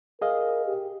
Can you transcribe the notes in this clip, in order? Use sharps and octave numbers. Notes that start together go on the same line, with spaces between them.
G#4 A#4 D#5 F5
G4